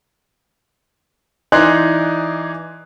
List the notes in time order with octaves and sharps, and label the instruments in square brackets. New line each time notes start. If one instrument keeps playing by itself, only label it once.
[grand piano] E3 D#4 G#4 D5 C6 F#6